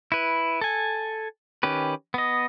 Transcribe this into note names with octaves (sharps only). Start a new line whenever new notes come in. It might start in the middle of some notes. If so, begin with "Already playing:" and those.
E4 B4
A4 G#5
D#3 C#4 G4 B4
B3 D#5